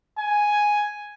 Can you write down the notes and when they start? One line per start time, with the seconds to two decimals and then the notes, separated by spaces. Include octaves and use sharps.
0.18 G#5